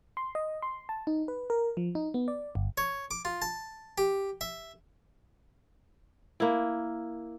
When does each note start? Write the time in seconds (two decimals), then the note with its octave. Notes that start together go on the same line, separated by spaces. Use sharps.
0.17 C6
0.35 D#5
0.62 C6
0.89 A5
1.07 D#4
1.28 B4
1.50 A#4
1.77 F3
1.95 D#4
2.14 B3
2.28 D5
2.55 G1
2.78 C#5
3.11 D6
3.25 F4
3.42 A5
3.98 G4
4.41 E5
6.40 A#3 E4